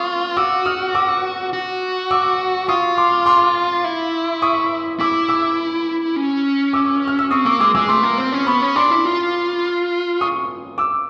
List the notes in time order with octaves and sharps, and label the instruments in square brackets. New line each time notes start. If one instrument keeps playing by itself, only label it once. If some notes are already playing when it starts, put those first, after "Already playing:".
Already playing: [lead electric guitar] F4 [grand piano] C#6 D#6
[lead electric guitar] F#4 [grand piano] D6 E6
[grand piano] D#6 F6
D6 E6
[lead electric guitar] F#4
[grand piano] D6 E6
[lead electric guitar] F4 [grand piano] C#6 D#6
[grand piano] C6 D6
C6 D6
[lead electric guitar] E4
[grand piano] C#6 D#6
[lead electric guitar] E4 [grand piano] D6 E6
[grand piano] D6 E6
[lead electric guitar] C#4
[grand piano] D6 E6
F6
E6
[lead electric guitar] C4 [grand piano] C#6 D#6
[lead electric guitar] A#3 [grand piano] D6 E6
[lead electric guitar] G#3 [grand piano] D6 E6
[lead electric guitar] G#3 [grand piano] D6 E6
[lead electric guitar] A3 [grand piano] C6 D6
[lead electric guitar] A#3
C4
C#4
[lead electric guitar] B3 [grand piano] B5 C#6
[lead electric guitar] C#4
[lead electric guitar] D4 [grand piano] C6 D6
[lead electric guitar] E4
F4
[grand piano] C#6 D#6
D6 E6